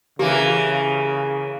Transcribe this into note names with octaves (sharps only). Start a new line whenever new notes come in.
C#3 E3 A#3 G4